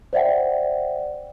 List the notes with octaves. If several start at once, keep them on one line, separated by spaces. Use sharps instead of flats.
C5 D5 E5 F#5 G5